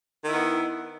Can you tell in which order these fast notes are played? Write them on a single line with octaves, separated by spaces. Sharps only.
D#3 E4 B3